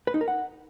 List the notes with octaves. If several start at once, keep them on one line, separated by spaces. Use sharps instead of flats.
B4
D#4
A#4
F#5